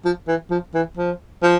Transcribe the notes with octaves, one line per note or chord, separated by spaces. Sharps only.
F3
E3
F3
E3
F3
F3